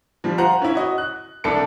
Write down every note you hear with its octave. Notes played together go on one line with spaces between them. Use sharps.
F3 G3
F4 C5 F#5 A#5
C#4 E4
F#4 D#5
F#6
C2 D4 A4 C#7